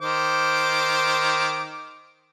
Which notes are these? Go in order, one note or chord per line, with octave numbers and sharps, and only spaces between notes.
D#3 C5 D6